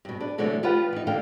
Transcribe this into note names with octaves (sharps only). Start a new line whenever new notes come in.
G2 B2
D4 B4
B2 D3 E3 F#3 A3
F3 F4 G4 B4 F#5
E3 D#4
D2 D3 E3 A#3 F5 G5